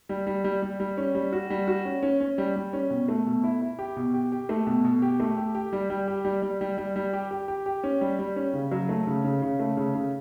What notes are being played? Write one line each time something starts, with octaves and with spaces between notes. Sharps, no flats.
G3
G3
G3
G3
G3
C#4
G3
F#4
G3
F#4
C#4
C#4
C#4
G3
G3
C#4
B2
A3
B2
E4
E4
G4
B2
G4
G4
A3
B2
B2
G4
A3
G4
G4
G3
G3
G4
G3
G3
G3
G3
G3
G4
G4
G4
G4
C#4
G3
G3
C#4
C#3
F#3
A3
C#3
C#3
C#3
A3
C#3
C#3